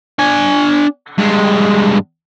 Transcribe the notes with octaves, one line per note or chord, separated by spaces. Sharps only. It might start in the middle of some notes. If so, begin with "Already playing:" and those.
D4 G#5
G2 G#3